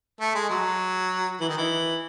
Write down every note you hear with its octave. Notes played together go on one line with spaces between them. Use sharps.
A3
G#3
F#3
E3
D#3
E3